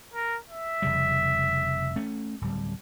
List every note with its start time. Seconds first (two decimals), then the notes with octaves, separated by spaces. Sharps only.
0.14 A#4
0.49 E5
0.82 F1 C#3 G3
1.96 A3 C#4
2.41 D1 G3